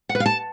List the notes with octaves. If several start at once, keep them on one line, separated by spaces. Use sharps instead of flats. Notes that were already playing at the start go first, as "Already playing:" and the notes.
F#5
B4
F5
A5